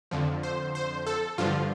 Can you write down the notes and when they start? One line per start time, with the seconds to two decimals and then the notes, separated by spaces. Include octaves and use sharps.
0.11 F2 D3 F3
0.43 C5
0.75 C5
1.07 A4
1.38 G2 D3 F3 F4